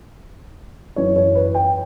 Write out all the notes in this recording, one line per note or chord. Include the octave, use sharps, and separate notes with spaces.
F#2 E3 C#5
C#5
B4
G5